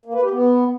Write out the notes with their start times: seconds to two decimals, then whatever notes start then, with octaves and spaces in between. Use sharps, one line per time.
0.05 A#3
0.14 B4
0.22 G4
0.31 B3